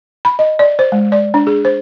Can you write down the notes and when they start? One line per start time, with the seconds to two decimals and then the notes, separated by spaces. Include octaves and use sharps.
0.25 B5
0.39 D#5
0.59 D5
0.79 C5
0.92 G#3
1.12 D5
1.34 D4
1.47 G#4
1.65 C5